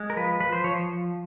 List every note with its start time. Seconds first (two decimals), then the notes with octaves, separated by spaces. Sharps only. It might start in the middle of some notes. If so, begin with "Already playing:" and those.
Already playing: G#3
0.10 A#4
0.17 F3 B4
0.40 F3 B4
0.53 C5
0.64 F3 C#5